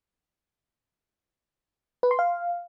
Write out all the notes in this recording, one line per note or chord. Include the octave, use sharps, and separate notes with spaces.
B4
C6
F5